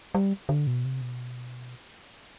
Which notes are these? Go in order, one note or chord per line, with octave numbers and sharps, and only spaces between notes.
G3
D3
B2
C3
B2